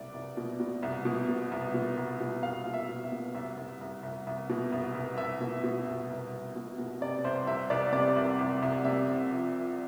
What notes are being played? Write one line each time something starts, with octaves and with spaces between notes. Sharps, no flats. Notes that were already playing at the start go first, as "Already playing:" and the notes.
Already playing: C2 B2 D5
C2
B2
B2
C2
B2
B2
C2
B2
C2
B2
C2 F5
B2
E5
B2
E5
B2
C2 E5
C2
C2
C2
C2
B2
C2
C2
C2 E5
B2
B2
C2
C2
C2
B2
B2
C3 D5
C2 C5
C2 E5
C2 D5
C3 D5
C2
C2
C2
C3 E5
C3
F3
F3